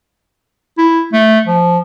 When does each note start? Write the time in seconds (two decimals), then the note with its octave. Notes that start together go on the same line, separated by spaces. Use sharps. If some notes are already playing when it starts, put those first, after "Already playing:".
0.78 E4
1.13 A3
1.46 F3